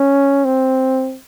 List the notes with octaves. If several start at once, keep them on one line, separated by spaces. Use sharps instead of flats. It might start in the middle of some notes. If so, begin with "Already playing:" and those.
Already playing: C#4
C4